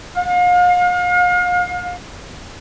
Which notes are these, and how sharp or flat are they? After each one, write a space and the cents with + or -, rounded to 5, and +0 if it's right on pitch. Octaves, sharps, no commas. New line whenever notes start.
F5 +40